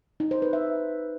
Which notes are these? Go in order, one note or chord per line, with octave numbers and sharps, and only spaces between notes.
D#4
C5
B4
E5